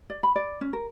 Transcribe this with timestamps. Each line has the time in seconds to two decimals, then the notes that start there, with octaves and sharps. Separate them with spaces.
0.10 D5
0.23 B5
0.36 D5
0.61 C#4
0.73 A#4